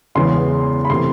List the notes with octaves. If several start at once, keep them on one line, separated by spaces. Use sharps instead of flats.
E2 C#3 E3 G#3 B3 C6
B5
C3 E3 A3 C4 C6